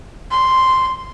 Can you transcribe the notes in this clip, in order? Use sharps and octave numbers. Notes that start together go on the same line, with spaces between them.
C6